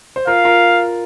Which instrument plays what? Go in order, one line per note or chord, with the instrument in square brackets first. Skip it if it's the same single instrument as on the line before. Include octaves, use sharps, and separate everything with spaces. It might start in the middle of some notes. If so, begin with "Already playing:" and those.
[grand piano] C5
[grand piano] F4 A#4 [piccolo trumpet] F5
[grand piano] F4 A#4